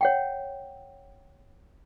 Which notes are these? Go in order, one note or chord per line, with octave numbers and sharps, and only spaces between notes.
C#5 F#5 G5